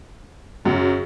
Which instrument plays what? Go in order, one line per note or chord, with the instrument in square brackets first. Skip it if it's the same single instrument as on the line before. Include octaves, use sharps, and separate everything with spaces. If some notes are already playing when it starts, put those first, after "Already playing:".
[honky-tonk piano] F#2 [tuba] C#3